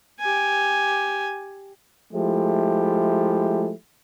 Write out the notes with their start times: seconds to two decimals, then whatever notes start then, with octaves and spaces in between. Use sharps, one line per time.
0.20 G4 G#5
2.13 F3 G#3 A3 E4 G4